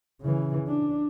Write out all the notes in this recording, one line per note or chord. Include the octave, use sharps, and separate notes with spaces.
C#3 E3
D4